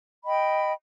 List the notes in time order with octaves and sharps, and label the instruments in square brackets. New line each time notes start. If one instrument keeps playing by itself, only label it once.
[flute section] D#5 G5 B5